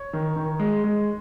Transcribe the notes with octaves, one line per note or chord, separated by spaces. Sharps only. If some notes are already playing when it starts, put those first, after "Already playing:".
Already playing: C#5
D#3
D#3
G#3
G#3